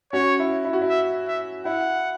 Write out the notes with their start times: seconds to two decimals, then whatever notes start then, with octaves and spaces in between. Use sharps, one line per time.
0.13 C#4 F#4 C#5
0.39 E4
0.65 E4
0.73 F#4
0.82 E4
0.89 E5
1.28 E5
1.65 E4 F#5